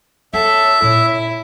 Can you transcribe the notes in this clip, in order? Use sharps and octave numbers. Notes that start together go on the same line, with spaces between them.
C#4 A4 C#5 E5
A#2 E4